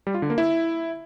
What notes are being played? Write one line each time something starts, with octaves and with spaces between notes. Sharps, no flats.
G3
F4
D3
A#3
E4